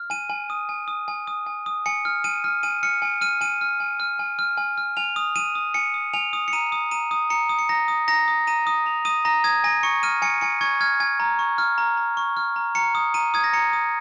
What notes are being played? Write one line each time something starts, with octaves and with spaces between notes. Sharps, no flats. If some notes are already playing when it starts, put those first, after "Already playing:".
Already playing: F6
G#5 D#7
G#5
D#6
G#5
D#6
G#5
D#6
G#5
D#6
G#5 C#7
F6
G#5 D#7
F6
G#5 D#7
F6 C#7
G#5
F6 D#7
G#5 D#7
F6
G#5
F6
G#5
F6
G#5
F6
G#5 F7
D#6
G#5 D#7
D#6
G#5 C#7
D#6
G#5 F7
D#6
C#7
A#5 D#7
D#6
A#5 D#7
D#6
A#5 C#7
D#6
C#7
A#5 A#6
D#6
A#5 A#6
D#6
A#5 D#7
D#6
A#5 F7
D#6 D#7
A#5 A#6
D#6 G#6
G#5 A#6
C#6 C#7
F6 D#7
G#5 C#7
G#5 C#7
C#6 G#6
F6 G#6
G#5 G#6
A#5
C#6
F6
A#5
A#5
C#6
F6
A#5
A#5 C#7
D#6
A#5 D#7
D#6 G#6
A#6
A#5 C#7
D#6